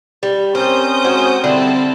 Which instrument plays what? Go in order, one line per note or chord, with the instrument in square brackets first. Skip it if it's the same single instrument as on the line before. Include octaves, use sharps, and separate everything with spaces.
[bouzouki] G3
[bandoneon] C4 C#4 A#4 [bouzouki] C5 [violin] D#6 G6
[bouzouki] G#3 F#4 C5
[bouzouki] D3 [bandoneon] G3 E4 [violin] C4 A4